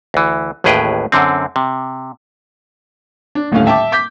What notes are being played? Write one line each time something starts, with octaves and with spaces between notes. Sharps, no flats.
D2 E3
A1 D#2 A2 G#4 B4 G5
F#2 D3 C4
C3
D4
D#1 A2 D3 A3 C#4 F5
E5 G5 A5 D6
D6 G6 B6